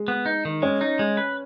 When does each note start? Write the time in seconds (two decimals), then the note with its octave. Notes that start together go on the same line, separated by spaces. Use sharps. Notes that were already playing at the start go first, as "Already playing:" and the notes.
Already playing: G#3
0.08 B3
0.26 D#4
0.45 D#3
0.62 G#3 C#4
0.81 D#4
0.99 G#3
1.17 B4